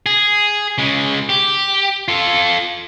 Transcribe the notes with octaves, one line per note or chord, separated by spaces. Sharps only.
G#4
C#3 G#3
G4
F4 A4